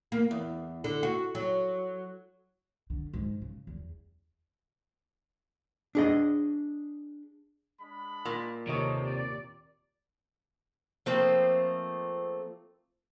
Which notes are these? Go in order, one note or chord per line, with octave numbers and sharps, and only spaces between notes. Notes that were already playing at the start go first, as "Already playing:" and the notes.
A#3
E2
D3
F#4
F#3
D3
G#2
C#3
E2
D4 G#4 D#5
G#3 D4 B5
A#2
D#2 C3 A#3 A4 C#5 D#5 C#6
D5
F3 A3 A#3 C4